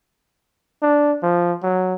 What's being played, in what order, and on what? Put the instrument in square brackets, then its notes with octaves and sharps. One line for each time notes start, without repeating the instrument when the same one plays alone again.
[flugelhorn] D4
F3
F#3